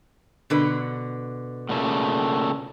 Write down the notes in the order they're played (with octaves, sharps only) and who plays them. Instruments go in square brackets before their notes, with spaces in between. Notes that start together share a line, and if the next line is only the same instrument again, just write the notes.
[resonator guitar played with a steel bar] B2 D3 B4
[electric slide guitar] A#2 C#3 A3